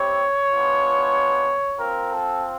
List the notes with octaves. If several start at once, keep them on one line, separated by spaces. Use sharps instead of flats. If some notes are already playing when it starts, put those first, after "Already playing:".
Already playing: C4 E4 G4 C#5
G#3 B3 D4 F4
C4 F4 A#4
A4